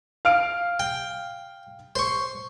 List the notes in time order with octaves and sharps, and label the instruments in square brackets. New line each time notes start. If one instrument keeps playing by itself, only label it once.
[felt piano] F5 F6 D7
[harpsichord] G5
C5 C#6